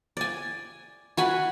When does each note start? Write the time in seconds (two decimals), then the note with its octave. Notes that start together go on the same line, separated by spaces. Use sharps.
0.17 D5 G#5
1.17 F#4 G#5 B5